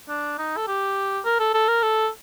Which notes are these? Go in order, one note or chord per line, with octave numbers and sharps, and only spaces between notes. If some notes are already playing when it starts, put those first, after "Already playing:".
D4
D#4
A4
G4
A#4
A4
A4
A#4
A4